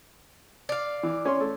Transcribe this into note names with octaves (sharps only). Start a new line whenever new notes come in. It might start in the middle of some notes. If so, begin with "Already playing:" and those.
D5 F5
E3
C#4 C6
A3